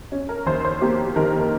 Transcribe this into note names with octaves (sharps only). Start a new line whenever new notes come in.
C#4
A#4
D#2 C5
C5
A#3 G4
D#3 A#4
A#4